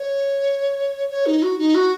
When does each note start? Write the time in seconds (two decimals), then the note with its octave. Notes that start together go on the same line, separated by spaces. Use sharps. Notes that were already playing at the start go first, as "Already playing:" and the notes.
Already playing: C#5
1.10 C#5
1.26 D#4
1.43 F#4
1.59 D#4
1.75 F#4